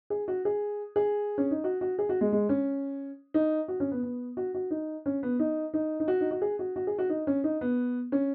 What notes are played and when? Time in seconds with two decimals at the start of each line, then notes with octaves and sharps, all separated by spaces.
0.10 G#4
0.28 F#4
0.45 G#4
0.96 G#4
1.38 C#4
1.51 D#4
1.64 F#4
1.81 F#4
1.99 G#4
2.09 F#4
2.21 G#3
2.32 G#3
2.49 C#4
3.34 D#4
3.68 F#4
3.80 C#4
3.92 B3
4.03 B3
4.37 F#4
4.55 F#4
4.71 D#4
5.06 C#4
5.23 B3
5.39 D#4
5.74 D#4
6.00 D#4
6.08 F#4
6.21 D#4
6.31 F#4
6.42 G#4
6.59 F#4
6.76 F#4
6.87 G#4
6.99 F#4
7.09 D#4
7.27 C#4
7.44 D#4
7.61 B3
8.12 C#4